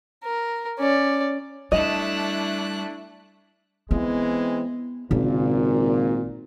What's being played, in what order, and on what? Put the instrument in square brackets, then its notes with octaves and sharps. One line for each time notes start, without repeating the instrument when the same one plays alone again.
[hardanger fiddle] A#4
C#4 D5
[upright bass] G3 [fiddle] A3 F#6 [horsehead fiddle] D4 E4 [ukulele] D#5
[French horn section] E3 G#3 C4 [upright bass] B3
[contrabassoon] G#1 [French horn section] A#2 [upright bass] C#3